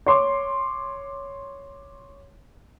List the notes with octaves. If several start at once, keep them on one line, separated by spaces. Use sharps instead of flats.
C#5 C6 D6